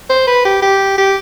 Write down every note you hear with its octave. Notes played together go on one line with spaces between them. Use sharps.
C5
B4
G4
G4
G4